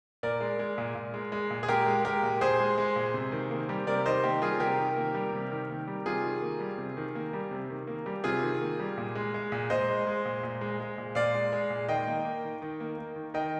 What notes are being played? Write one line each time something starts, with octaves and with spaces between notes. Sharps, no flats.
A#2 A#4 D5
G#3
G#3
A#2
A#2
G#3
G#3
A#2
G#4
A#2 G4 A#4
G#3
G#3 G4 A#4
A#2
A#2 G#4 C5
G#3
G#3
A#2
C3
D#3
A#3
G3
C3 A#4 D5
D#3 C5 D#5
A#3 G4
G3 F4 G#4
C3 G4 A#4
D#3
A#3
G3
C3
D#3
A#3
G3
C3 F4 G#4
D#3
A#3
G3
C3
D#3
A#3
G3
C3
D#3
A#3
G3
C3 F4 G#4
D#3
A#3
G3
A#2
G#3
G#3
A#2
A#2 C5 D#5
G#3
G#3
A#2
A#2
G#3
G#3
A#2
A#2 D5 F5
G#3
G#3
A#2
D#3 D#5 G5
A#3
A#3
D#3
D#3
A#3
A#3
D#3
D#3 D#5 G5